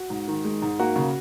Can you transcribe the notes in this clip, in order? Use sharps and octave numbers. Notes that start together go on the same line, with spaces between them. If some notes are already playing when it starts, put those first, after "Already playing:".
Already playing: F#4
G#2
D#3
G#3
G#2
A#3 F#4
C#3